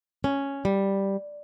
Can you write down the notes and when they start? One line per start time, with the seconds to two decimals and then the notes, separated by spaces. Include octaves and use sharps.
0.24 C#4
0.65 G3